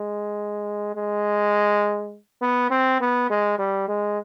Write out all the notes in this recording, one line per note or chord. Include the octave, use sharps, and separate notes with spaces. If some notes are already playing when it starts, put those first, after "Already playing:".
Already playing: G#3
G#3
B3
C4
B3
G#3
G3
G#3